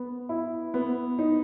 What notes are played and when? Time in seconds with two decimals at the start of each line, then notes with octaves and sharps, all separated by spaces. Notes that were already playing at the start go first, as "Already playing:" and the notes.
Already playing: B3
0.29 E4
0.74 B3
1.19 D#4